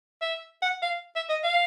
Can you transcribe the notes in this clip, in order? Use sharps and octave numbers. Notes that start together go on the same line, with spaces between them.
E5
F#5
F5
E5
D#5
F5